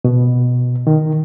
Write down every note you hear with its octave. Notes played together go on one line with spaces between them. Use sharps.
B2
D#3